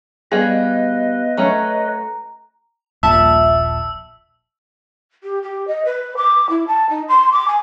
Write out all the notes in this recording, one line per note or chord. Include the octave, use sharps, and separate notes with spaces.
G3 B3 G#4 B4 D#5 F5
F#3 A3 C#4 A#5
D#1 A#1 A#2 E5 A5 E6
G4
G4
D#5
B4
D6
E4
A5
D#4
C6
D6
G#5